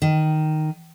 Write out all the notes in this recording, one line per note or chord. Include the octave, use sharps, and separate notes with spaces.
D#3